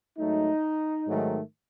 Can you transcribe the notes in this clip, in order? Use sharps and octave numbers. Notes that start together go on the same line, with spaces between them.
G#2 F#3 A3 D#4
G#2 D#3 F#3 A3